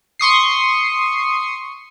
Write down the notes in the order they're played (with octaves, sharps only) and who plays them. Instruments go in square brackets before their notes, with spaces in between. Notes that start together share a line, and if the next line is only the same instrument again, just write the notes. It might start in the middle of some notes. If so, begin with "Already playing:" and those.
[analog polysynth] C6 C#6 D#6 C7